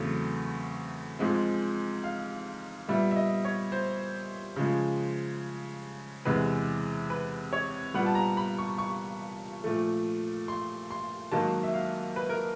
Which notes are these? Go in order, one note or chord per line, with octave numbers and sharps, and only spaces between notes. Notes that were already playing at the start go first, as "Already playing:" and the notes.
Already playing: E2 C#3 F#3 A3 C4
G#2 F3 G#3 C4
F5
A#2 G3 B3 E5
E5
D#5
C#5
C5
C#3 F3 G#3
E2 C3 E3 G#3 B4
B4
C#5
A#2 G3 B3 F#5
A5
A#5
B5
C#6
C#6
A#2 F3 A3
C6
C6
G#2 D#3 F#3 A#3 A5
E5
F5
B4
A#4